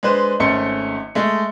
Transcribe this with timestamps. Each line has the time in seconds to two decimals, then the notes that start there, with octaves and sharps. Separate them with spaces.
0.03 G#3 D4 B4 C5
0.40 G#1 A3 C#4 C6 C#7
1.15 G#3 A3